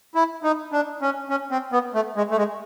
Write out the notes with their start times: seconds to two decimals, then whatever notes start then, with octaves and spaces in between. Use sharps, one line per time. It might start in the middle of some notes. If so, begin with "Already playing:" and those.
0.15 E4
0.43 D#4
0.72 D4
1.02 C#4
1.30 C#4
1.51 C4
1.72 B3
1.94 A3
2.16 G#3
2.31 A3
2.37 G#3